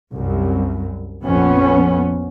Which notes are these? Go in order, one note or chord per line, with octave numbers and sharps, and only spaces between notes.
C2 F#2
A#1 F2 B3 C#4